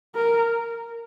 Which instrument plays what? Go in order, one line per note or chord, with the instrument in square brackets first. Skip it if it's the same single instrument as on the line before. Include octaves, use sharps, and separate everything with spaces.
[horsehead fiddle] A#4